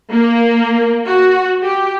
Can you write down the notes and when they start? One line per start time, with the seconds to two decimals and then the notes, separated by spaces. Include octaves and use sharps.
0.11 A#3
1.05 F#4
1.62 G4